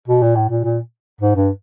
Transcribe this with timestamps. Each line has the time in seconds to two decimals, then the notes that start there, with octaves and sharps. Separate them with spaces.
0.08 B2
0.21 A#2
0.35 A2
0.49 A#2
0.64 A#2
1.21 G#2
1.35 G2